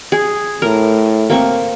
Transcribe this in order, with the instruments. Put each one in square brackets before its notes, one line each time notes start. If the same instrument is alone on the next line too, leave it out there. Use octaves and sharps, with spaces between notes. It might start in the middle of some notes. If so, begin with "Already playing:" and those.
[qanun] G#4
[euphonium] A2 [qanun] A#4
[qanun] A#3 C4 C#6